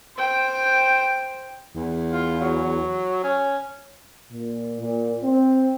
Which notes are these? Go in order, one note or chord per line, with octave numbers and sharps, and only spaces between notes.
C5 G5
E2
F4
F#3
C#4
A#2
A#2
C4